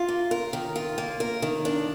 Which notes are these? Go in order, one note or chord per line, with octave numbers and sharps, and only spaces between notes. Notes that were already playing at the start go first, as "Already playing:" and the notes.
Already playing: F4
A#3
A#4
D#3
F4
A#3
A#4
D#3
D4